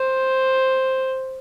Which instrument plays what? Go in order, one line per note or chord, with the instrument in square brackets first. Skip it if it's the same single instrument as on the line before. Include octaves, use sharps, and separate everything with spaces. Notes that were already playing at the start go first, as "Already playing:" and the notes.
Already playing: [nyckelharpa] C5